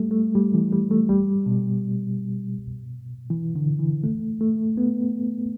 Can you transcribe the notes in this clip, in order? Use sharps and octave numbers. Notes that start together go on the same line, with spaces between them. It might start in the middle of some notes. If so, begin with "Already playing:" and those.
Already playing: G3 A3
A3
G3
E3
G3
A3
G3
B2
E3
D3
E3
A3
A3
B3